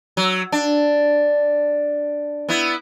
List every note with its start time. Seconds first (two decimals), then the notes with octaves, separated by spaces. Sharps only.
0.17 F#3
0.52 D4
2.49 B3 E4